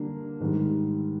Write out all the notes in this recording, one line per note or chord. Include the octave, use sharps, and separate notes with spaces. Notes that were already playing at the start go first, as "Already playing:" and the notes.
Already playing: D3 G3 A#3 D4
G#2 D#3 G3